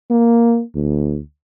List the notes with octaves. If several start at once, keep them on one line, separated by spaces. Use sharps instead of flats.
A#3
D2